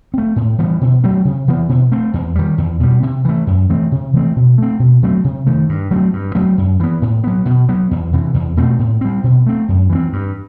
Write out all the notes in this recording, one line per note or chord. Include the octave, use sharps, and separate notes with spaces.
A3 C4
A2
E3 G3 B3
B2
F#3 A3 C4
C3
E3 B3
B2
A3 C4
E2
D#3 G3
E2
B2 G3
C3
E3 A3
F#2
E3 A3 C4
C3
E3 A3 C4
B2
A3 C4
B2
F#3 A3 C4
C3
D#3 A3
G2
F#3 A3 C4
G2
F#3 A3 C4
F#2
E3 B3
A2
F#3 B3
B2
F#3 B3
E2
C3 E3
E2
B2 A3 C4
A2
G3 C4
B2
A3 C4
F#2
E3 A3
C4
G2